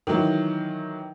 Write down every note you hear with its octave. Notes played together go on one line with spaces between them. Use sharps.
D#3 E3 F#3